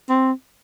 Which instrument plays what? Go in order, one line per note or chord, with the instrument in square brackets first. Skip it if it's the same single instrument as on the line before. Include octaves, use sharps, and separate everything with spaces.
[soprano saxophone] C4